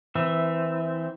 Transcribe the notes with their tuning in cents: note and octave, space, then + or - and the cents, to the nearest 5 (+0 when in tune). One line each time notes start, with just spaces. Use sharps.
E3 -10 C4 -25 E5 +0